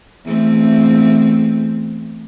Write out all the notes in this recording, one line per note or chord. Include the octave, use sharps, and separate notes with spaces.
E2 A3 C4